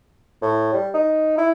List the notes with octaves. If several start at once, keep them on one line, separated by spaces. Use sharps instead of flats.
A2
G3
D#4
E4